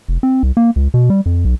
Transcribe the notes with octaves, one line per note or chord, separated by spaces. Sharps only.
F1
C4
C2
A#3
C#2
B2
G3
F2
B1